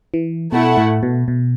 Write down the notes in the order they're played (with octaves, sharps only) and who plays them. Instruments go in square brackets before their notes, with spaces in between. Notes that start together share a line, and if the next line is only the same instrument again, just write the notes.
[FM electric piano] E3
[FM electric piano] B2 [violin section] A3 E4 A4 F#5
[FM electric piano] A2
B2
B2